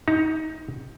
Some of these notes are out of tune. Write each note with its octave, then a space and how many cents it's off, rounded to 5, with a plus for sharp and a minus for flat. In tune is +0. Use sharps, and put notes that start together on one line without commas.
D#4 +25 A#5 -10